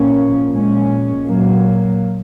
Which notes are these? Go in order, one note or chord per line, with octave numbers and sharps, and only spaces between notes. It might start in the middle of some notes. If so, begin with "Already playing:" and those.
Already playing: A#2 F3 A#3 C#4
A#2 G#3 C#4
A#2 F#3 A#3